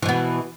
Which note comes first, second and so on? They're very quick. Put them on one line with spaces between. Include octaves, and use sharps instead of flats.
E3 B2 B3